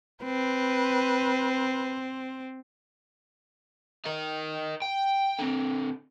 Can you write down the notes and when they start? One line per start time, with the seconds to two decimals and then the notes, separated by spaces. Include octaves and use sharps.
0.24 C4 B4
4.05 A#4 D#5
4.82 G5
5.39 D3 C4